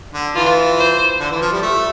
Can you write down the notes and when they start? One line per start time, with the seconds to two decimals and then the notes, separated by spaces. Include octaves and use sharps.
0.14 D3
0.35 E3 F4
0.78 C5
1.20 D3
1.31 E3
1.41 F3
1.52 G3
1.62 A3